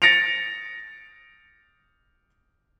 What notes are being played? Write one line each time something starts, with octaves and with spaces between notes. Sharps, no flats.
A6 A#6 C#7 D7 F7